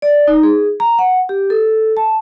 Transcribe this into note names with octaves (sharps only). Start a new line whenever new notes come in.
D5
D#4
G#4
A#5
F#5
G4
A4
A5